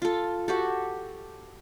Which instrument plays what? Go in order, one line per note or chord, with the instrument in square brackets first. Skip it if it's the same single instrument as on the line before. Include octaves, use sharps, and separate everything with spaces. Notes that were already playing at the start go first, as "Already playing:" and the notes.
[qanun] F4 A4
F#4 G4 A4